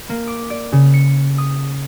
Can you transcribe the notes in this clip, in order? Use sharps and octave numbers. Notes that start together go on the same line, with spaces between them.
A#3
D6
D5
C#3
C#7
D#6